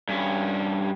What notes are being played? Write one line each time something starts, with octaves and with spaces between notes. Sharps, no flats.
G2 C#4